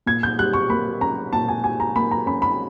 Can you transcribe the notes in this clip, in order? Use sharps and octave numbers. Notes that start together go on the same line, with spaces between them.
A#2 G#6
G6
G3 F#6
C#6
A#3 B5
C#4 A#5
A#2 A5
G#5
G3 G#5
A#5
A#3 B5
A#5
C#4 B5
B5